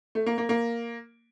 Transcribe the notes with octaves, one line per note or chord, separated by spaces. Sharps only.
A3
A#3
A#3
A#3